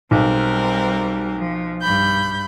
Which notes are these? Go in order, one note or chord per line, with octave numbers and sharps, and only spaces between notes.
B1 G3 C4 A#4
F3
G2 B5 G6